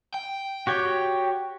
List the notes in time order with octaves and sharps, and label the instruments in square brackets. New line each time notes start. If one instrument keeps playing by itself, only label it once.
[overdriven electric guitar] G5
[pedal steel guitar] F#4 G4 C#5